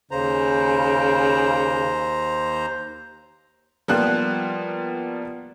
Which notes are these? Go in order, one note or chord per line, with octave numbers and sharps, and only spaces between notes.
D#2 C#3 C5 A#5
F3 G3 A#3 B3 F4 F#6